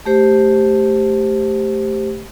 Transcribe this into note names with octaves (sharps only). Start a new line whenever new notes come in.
A3 G4 C5